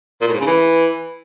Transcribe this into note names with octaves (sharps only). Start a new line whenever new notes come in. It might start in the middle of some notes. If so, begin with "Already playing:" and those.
A#2
A2
G#2
C#3
E3